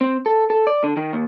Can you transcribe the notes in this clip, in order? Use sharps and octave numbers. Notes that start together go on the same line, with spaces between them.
C4
A4
A4
D5
D3
D#3
D#2